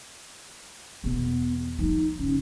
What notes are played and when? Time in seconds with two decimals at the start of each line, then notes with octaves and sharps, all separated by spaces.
1.04 E2 B2 B3
1.79 F3 D#4 F4
2.19 F#1 C#3 C#4